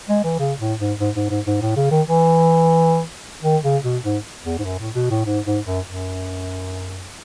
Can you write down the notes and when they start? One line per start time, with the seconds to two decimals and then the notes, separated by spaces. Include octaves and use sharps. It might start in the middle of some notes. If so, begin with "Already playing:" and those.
0.09 G#3
0.24 E3
0.39 C#3
0.60 A2
0.79 G#2
1.00 G#2
1.15 G#2
1.30 G#2
1.46 G#2
1.62 A2
1.76 C#3
1.91 D#3
2.07 E3
3.43 D#3
3.63 C#3
3.83 B2
4.04 G#2
4.45 E2
4.58 G#2
4.65 F#2
4.79 A2
4.95 B2
5.10 A2
5.25 G#2
5.46 G#2
5.66 F#2
5.85 F#2